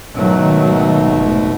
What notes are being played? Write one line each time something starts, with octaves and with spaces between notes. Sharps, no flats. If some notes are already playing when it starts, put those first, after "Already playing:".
G#2 B2 D#3 F#3 A3
F1